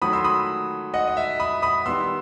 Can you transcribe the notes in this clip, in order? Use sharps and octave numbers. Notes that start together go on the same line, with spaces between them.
D#3 F#3 A3 B5 D#6
C6 E6
B5 D#6
D#5 F#5
D#5
E5
B5 D#6
B5 D#6
D#3 G3 B3 C6 E6